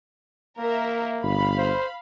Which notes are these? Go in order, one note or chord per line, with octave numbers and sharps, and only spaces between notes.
A#3 A#4 E5
G1 F5 B5
C5